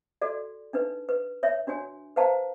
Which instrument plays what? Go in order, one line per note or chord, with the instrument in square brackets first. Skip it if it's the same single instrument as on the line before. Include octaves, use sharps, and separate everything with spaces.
[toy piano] F#4 A4 D5
D4 D#4 B4
B4
C#5 E5
D4 F#4 C#5 G#5
B4 C5 F5 A5 A#5